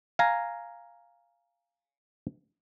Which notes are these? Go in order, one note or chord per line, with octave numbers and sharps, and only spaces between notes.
F5 G#5 A#5